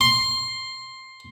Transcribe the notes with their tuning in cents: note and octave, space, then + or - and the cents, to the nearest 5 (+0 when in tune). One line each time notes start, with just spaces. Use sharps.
C6 +10